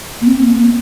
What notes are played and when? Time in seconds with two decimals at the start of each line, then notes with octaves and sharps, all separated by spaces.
0.21 A#3
0.27 C4
0.41 A#3
0.54 A#3